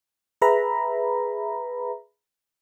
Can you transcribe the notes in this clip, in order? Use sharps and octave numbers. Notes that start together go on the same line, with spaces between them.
G#4 B4 E5 A#5 B5